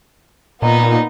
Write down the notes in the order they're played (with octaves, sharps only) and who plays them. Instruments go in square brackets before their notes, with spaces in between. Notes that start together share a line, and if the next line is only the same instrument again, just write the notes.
[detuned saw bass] A#2 [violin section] B3 D#4